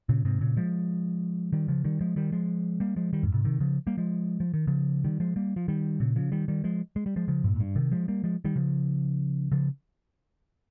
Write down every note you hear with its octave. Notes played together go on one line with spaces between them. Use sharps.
A#2 C#3
G#2 C3
A#2 C#3
F3 G#3
D#3 G3
C#3 F3
D#3 G3
F3 G#3
D#3 G3
F3 G#3
G3 A#3
F3 G#3
D#3 G3
F2 G#2
G#2 C3
C3 D#3
C#3 F3
G3 A#3
F3 G#3
F3
D#3
C#3 F3
D#3 G3
F3 G#3
G3 A#3
F3
D#3 G3
A#2 C#3
C#3 F3
D#3 G3
D#3 G3
F3 G#3
G#3
G3
F3 G#3
C#3 F3
G2 A#2
G#2
G2
C3 D#3
F3 G#3
G3 A#3
F3 G#3
D#3 G3
C#3 F3
C#3 F3